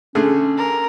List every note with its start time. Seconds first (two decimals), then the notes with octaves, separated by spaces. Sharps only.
0.15 D3 A3 C#4 G#4
0.58 A#4